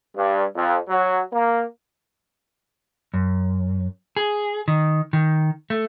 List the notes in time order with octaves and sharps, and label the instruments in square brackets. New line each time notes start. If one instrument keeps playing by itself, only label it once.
[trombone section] G2
F2
F#3
A#3
[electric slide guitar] F#2
G#4
D#3
D#3
A3